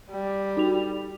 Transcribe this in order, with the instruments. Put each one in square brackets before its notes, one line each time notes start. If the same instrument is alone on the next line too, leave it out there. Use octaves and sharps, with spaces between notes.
[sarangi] G3
[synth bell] D#4 F#4 F7